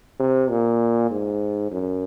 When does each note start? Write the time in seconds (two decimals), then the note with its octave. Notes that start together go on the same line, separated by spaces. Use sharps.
0.20 C3
0.50 A#2
1.10 G#2
1.71 F#2